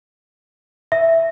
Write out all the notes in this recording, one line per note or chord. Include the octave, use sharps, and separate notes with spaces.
E5